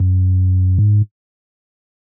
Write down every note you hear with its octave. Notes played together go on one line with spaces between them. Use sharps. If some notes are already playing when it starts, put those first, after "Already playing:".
Already playing: F#2
G#2